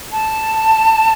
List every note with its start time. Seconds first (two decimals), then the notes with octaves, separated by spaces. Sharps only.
0.12 A5